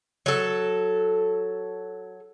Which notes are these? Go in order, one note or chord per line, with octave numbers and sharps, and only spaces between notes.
F#3 A4